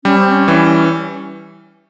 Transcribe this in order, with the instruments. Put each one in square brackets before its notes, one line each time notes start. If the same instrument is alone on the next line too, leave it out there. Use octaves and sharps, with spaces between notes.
[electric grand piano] G3 [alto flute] C#4
[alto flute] C4
C#4
[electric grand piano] E3 [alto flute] C#4